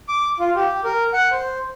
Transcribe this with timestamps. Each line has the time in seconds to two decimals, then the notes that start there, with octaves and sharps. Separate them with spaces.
0.09 D6
0.40 F4
0.55 G4
0.84 A#4
1.13 F#5
1.31 C5